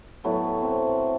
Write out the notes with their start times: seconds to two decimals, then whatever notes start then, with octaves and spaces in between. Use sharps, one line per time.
0.24 A2 F#3 A3 B3
0.62 C4